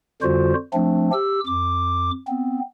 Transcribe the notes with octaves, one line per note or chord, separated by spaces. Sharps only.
F2 D3 G3 F4 F#4 C5
F3 A3 C4 D4
G4 E6
F2 D6
B3 C4